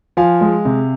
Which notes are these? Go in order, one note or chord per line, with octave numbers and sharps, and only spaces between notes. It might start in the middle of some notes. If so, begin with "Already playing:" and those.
F3 F5 G#5
G#3
C3